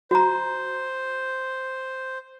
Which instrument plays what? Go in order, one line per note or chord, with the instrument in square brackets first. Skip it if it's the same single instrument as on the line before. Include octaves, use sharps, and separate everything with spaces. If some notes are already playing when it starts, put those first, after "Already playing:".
[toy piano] F#4 A#5 [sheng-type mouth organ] C5